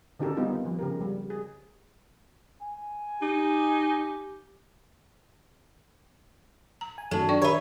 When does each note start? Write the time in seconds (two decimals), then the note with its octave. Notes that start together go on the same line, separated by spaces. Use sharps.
0.19 D3 D#3 C#4 G4 A4 A#4
0.37 G3 B3 C4 D#4 F4 G4
0.66 F3
0.79 C#3 G4 A#4
1.01 G3
1.30 G#4
2.62 G#5
3.22 D#4 G4
6.81 A#5
6.98 G#5
7.11 F#2 D#3 F#3 A3 A4 A5
7.29 D4 D5 G5 C#6
7.42 D#3 G4 B4 C#5 E5 B5